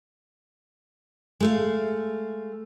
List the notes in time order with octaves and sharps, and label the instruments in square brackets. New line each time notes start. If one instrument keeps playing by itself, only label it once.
[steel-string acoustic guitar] G#3 A3 F5